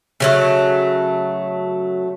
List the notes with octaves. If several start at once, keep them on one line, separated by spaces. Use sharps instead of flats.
C#3 F#3 A3